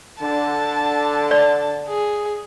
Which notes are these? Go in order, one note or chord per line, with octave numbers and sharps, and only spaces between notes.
D3 A5
D5 A5
G#4